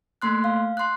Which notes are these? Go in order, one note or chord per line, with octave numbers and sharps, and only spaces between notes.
A3 A#3 C6 F#6
F5
C6 F#6